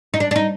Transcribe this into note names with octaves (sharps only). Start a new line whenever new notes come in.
D#4
D4
D4
D#4